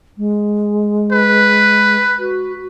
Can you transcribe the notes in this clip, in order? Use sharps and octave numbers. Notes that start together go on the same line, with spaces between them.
G#3
B4
F#4